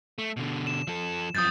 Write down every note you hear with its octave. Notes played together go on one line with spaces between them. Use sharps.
A3
B2 D3
E7
F3 A4
F#2 F3 D#6 G6 A6